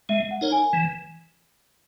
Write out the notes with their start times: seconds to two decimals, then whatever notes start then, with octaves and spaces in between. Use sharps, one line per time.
0.09 G#3 E5
0.31 F#5
0.41 D#4 A#4 C#5
0.52 G#5
0.73 E3